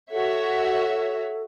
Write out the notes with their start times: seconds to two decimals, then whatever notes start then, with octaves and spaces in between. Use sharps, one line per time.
0.11 F#4 A4 C#5 E5